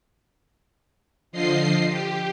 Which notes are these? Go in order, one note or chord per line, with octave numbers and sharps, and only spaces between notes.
D3 F3 F4 D#5 C7
G4